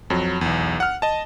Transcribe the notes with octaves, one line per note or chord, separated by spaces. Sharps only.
F2 F#3
B1 E2
F#5 F6
D#5 A5